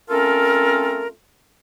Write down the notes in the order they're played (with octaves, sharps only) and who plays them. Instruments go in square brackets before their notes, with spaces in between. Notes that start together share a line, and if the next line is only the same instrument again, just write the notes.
[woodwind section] A3 C4 C#4 F4 A4 A#4